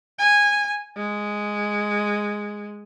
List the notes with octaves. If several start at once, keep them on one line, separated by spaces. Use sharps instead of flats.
G#5
G#3